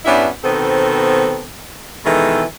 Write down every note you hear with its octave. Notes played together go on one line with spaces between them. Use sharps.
G2 B3 C#4 D4 E4 E5
B2 D#3 B3 C4 A4 C5
B2 D#3 E3 G#3 A4